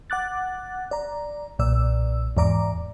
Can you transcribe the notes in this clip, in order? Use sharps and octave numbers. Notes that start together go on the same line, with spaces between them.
F#5 D6 F#6 A6
D5 A#5
B1 A#2 D5 E6
E2 G#2 D5 A#5 D6